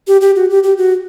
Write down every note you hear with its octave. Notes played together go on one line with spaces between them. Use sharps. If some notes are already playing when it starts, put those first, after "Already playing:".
G4
G4
F#4
G4
G4
F#4